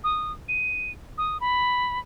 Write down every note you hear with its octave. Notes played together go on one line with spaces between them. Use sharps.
D#6
D#7
D#6
B5